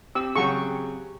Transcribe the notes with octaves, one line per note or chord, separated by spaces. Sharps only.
C4 G4 E6
C#3 F#3 G5 C#6